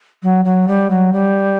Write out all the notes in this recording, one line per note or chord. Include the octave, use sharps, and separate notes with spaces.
F#3
F#3
G3
F#3
G3